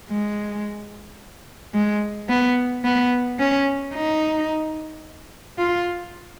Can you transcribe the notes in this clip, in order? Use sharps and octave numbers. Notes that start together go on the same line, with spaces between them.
G#3
G#3
B3
B3
C#4
D#4
F4